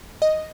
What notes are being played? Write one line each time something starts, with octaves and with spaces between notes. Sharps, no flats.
D#5